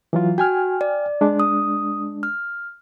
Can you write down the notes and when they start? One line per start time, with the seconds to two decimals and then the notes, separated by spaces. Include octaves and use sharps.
0.13 E3 F#3 F4
0.38 F#4 G5 G#5 F6
0.81 D5
1.21 G#3 D4
1.40 D#6
2.23 F6